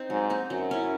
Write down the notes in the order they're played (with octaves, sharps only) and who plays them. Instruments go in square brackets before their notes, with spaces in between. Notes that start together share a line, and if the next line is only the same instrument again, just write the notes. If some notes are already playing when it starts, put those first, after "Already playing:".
Already playing: [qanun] C4 D#4
[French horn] G#2 [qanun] F#3
[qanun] C4 D#4
[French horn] F#2 [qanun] F#3
[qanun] C#4 E4